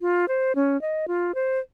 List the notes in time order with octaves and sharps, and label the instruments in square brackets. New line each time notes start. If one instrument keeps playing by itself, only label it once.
[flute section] F4
C5
C#4
D#5
F4
C5